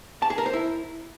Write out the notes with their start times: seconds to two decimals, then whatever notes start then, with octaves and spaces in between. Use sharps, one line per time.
0.22 A5
0.30 G#4
0.38 A#4
0.46 C5
0.53 E4